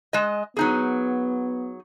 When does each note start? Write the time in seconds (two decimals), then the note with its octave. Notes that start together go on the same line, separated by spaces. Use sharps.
0.13 G#3 D#5
0.57 F#3 B3 D#4 G#4